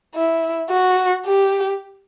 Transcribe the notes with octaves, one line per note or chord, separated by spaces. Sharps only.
E4
F#4
G4